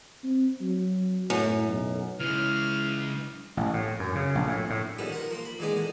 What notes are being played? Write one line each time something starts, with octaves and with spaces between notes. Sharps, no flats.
C4
F#3
F#2 A2
B1
C#3 E3 G#3 F6
A1
A2
F#2
C#3
A#1
A2
A2
D3 D#3 F3 G3 B3 C#4
A#4 C5 F#5
F3 A#3 C6
B5
A#2 D#3 E3 G#3 B3 D5
D3